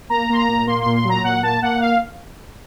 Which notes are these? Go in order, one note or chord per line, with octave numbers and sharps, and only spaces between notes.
A#3 A#5
A#3 C6
A#5
A#2
A#3 C6
A#2 C6
C6
F#3
A#5
A#2 F#5
A#3 A5
A#3 F#5
F5